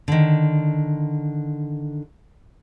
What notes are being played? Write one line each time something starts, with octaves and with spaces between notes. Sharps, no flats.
D3 D#3